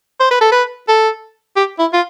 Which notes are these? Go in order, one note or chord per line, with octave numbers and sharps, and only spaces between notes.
C5
B4
A4
B4
A4
G4
E4
F4